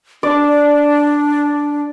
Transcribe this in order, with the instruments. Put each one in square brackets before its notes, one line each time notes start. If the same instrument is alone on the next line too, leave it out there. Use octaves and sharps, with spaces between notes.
[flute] D4 [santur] D5